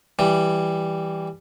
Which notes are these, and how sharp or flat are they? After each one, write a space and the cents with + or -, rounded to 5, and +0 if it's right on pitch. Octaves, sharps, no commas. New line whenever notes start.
E3 +0 G3 +5